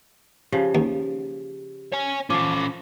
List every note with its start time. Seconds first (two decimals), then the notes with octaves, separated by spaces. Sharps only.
0.52 C#3 F3 G4
0.75 D#2
1.93 C#5 G#5
2.30 F3 C#4 F4 A4 D6